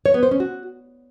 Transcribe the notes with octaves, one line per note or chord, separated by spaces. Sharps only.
C#5
B3
C5
C#4
F#4